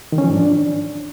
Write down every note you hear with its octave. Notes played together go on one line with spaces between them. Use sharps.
D#3
C#4
F3
G#2
D4